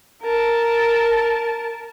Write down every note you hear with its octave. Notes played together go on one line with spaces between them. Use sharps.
A#4 A5